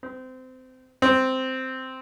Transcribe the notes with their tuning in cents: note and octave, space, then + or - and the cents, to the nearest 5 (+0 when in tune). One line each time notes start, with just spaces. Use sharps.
C4 -25
C4 -5